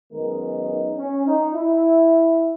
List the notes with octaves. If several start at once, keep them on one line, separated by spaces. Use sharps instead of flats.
F#2 D#3 G#3 B3 A#4
D#4
C#4
D#4
E4